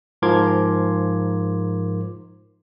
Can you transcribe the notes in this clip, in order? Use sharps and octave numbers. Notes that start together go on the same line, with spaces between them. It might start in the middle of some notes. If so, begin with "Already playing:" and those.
G#2 F3 A#4 C6 D6 G#6